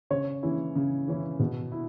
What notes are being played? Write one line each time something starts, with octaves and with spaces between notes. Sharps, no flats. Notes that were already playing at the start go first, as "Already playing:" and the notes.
C#3 C#5
E3 C#4 E4
C#3
E3 C#4 E4
B2
E4